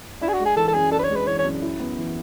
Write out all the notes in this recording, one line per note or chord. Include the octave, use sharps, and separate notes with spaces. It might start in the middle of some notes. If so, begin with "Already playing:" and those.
D4 E4
G#4
F#4
G#3
G#4
E3 A4
A4
F#2 G#4
D4 A4
B4
C#5
G#3
B4
E3 C#5
C#5
F#2
E4
B3
E3